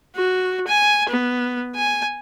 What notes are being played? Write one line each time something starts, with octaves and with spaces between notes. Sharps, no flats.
F#4
G#5
B3
G#5